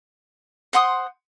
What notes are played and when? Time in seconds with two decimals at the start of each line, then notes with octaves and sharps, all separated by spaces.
0.73 C5 F#5 C6 D#6